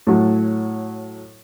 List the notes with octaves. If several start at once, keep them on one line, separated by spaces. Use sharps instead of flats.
A2 F#3